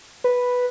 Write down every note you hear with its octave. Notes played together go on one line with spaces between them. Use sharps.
B4